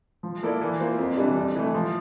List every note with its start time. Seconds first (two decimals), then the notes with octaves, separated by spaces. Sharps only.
0.23 F3
0.43 A#3 E4 A4 D5
0.61 E3
0.80 A#3 F4 C5
0.98 F2
1.17 C3 E3 G3 D4
1.37 F2
1.56 E3 A3
1.74 F3